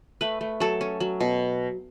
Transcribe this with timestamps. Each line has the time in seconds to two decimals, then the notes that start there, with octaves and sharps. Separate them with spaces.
0.21 A3 B4
0.41 A3
0.60 F#3 A4
0.81 C#4
1.00 F#3
1.20 B2